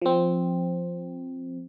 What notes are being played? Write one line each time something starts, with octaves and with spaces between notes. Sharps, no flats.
F3 C4